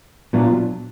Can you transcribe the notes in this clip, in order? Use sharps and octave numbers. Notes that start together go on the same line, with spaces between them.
A#2 F#3 B3 D4 F4